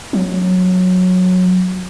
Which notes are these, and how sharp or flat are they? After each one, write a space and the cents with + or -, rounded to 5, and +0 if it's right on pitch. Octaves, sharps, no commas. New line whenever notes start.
F#3 -15